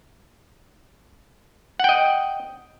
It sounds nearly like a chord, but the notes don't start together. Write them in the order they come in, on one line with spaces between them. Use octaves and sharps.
F#5 G5 D#5